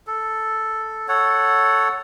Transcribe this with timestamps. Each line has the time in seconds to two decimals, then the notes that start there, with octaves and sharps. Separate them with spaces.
0.07 A4
1.08 A4 C#5 F#5